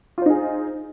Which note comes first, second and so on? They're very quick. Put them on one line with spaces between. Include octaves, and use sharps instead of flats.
F4 C5 D#4 G#4